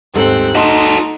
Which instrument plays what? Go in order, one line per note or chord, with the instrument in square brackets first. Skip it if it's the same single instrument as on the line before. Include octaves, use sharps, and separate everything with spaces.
[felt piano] D#1 G#2 A4 [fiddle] C4 F#6
[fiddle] D#4 [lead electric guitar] F#4 A4 [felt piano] D#5 C6